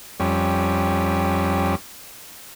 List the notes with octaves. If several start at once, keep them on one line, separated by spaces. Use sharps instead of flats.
F2 G3 C#4